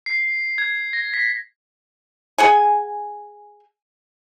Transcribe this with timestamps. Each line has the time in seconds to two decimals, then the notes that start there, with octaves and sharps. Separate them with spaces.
0.06 C7
0.58 G#6
0.93 A#6
1.14 B6
2.38 G#4 F#5 G#5